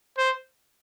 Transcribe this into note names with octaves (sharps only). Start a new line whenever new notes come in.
C5